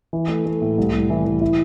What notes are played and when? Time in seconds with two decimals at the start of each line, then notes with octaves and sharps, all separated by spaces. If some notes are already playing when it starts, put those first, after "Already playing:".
0.13 E3
0.29 A3
0.46 A3
0.61 A2
0.78 C2
0.93 C2
1.10 E3
1.25 E3
1.41 E4